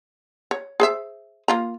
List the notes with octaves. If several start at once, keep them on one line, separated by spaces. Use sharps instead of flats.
C#5
G#4 C5 E5
A#3 F4 A#5